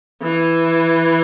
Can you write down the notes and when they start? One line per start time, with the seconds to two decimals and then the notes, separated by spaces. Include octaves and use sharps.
0.22 E3